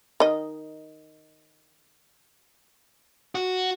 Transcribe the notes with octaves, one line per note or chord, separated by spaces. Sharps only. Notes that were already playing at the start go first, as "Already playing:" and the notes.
D#3 D#5
F#4